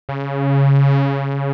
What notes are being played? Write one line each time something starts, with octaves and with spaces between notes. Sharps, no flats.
C#3